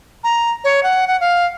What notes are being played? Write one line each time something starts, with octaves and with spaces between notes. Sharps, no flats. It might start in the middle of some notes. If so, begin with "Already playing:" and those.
A#5
C#5
F#5
F#5
F5